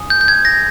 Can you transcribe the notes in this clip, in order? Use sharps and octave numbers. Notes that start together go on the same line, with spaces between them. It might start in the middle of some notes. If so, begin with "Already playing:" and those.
Already playing: G#5 D#6
G6
G6
G#6
A#6